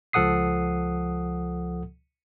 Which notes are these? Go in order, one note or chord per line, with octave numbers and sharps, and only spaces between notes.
C#2 F3 A4 F#5 D#6 C7